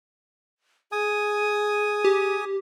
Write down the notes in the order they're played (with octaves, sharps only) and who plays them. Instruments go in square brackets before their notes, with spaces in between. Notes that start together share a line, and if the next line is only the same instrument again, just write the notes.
[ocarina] G#4 [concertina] G#5 D#6
[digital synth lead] G4